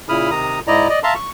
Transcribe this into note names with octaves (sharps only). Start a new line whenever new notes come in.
A#2 C#3 E4 B5 D#6 F6
C3 D#3 A#5 D#6
G#2 E4 D5 D#5 A#5
D5 D#5
E5 F5 A5 A#5 C6
C#6